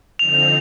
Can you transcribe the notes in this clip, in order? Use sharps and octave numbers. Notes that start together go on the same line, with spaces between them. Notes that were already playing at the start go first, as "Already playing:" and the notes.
D3 F3 C4 D#4 F7